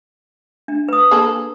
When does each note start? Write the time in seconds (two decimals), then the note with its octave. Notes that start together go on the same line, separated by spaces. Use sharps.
0.68 D4
0.88 B4 D#6
1.11 A#3 G#4 A4